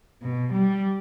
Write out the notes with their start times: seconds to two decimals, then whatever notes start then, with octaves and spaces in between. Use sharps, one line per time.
0.23 B2
0.53 G3